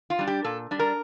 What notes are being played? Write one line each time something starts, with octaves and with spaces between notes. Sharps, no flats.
F4
G3 D4
G4
A#2 A4
G3 D4
A#4